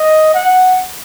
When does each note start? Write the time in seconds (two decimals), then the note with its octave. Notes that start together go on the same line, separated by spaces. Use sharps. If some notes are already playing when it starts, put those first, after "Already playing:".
Already playing: D#5
0.34 F#5